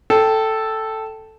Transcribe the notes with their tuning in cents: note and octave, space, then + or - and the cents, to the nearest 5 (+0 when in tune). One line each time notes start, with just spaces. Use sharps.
A4 +0 G5 -5